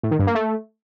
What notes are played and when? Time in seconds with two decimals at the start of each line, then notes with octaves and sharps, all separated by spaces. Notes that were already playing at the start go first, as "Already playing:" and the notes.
0.03 A2
0.11 D#3
0.19 G2
0.27 A#3
0.35 A3